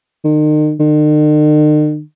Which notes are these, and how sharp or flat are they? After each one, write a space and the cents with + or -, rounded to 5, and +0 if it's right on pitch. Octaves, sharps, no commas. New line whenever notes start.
D#3 -35
D#3 -45